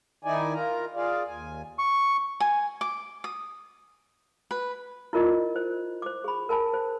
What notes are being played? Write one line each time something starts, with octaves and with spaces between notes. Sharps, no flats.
D#3 D#4 E4 D5 G#5
F4 A#4 A#5
F4 G#4 D5 F5
D#2 G#5
C#6
G#5
D6
D#6
B4
E4 F4 A#4 D5 D#5
C5
C5 D6
G#4 B5
A#4 G#5 A5 B5
C5